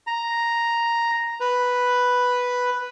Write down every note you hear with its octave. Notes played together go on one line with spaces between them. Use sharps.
A#5
B4